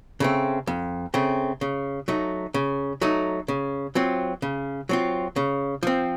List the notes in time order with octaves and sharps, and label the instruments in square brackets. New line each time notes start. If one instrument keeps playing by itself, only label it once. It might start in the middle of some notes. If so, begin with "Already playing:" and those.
[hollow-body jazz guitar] C#3 A3 C4
F2
C#3 A3 C4
C#3
F#3 A3 D#4
C#3
F#3 A3 D#4
C#3
F#3 C4 F4
C#3
F#3 C4 F4
C#3
F3 C4